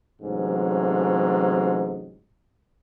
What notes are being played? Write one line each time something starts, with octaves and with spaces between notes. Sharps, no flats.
A1 G#2 C3 F#3